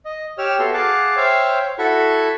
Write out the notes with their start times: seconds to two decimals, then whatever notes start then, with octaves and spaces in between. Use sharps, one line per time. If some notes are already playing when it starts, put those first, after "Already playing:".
0.05 D#5
0.38 G4 C#5 E6 F6
0.59 B3 F#4 A4 E5 C6
0.74 G#4 F5 F#5 A5 D6
1.17 C5 C#5 E5 F5 G5
1.79 E4 F#4 A4 F#5 B5 C#6